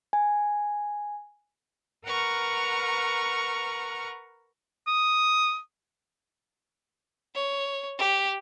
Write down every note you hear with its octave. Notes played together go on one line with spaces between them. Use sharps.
G#5
A#4 B4 F#5 A#5 C#6 F6
D#6
C#5
G4